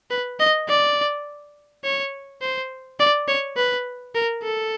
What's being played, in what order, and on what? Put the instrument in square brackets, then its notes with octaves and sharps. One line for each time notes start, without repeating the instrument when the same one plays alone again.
[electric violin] B4
D#5
D5
C#5
C5
D5
C#5
B4
A#4
A4